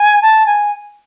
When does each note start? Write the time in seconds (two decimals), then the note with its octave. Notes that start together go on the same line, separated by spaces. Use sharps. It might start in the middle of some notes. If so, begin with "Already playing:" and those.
Already playing: G#5
0.22 A5
0.46 G#5